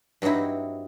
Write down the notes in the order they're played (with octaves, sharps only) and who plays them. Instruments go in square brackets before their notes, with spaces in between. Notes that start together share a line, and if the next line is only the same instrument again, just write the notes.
[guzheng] G2 F#3 C4 D#4 E4